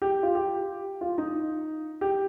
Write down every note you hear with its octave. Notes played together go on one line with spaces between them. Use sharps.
G4
F4
G4
F4
D#4
G4